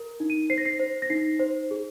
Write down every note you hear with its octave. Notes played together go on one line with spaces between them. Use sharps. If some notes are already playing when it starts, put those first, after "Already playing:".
Already playing: A#4
D#4
D#7
C5 C7
A#6
C7
C5
A#6
D#4 C7
C5
G#4